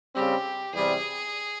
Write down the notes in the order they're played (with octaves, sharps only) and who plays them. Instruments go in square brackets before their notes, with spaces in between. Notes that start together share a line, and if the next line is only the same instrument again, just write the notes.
[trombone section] C#3 G3 C4 [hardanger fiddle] G4
[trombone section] E2 C3 G3 [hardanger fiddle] G#4